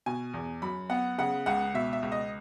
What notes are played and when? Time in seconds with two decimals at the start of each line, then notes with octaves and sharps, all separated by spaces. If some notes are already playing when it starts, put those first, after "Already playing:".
0.06 B2 G#5
0.34 E2
0.62 F#2 B5
0.90 B3 F#5
1.18 C#3 F#5
1.46 C#2 F#5
1.74 B2 E5
1.93 E5
2.03 C#2
2.12 D#5